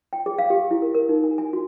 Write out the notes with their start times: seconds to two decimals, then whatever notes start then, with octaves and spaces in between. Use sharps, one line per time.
0.13 G5
0.26 G#4
0.38 F5
0.50 G4
0.71 E4
0.82 A#4
0.94 A#4
1.09 D#4
1.24 G#5
1.38 G#5
1.53 F#4